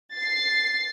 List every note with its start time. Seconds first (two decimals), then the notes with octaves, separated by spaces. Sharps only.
0.14 A6 C7